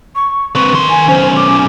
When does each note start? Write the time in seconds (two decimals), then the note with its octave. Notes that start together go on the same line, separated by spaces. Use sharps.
0.15 C#6
0.55 C4 B4 C#6
0.73 D#3 C6
0.90 G#5
1.08 B1 C#4 C5
1.36 D6